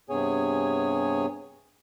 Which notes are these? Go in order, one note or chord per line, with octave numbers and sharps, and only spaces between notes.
G2 C3 B3 G#4 C#5 G#5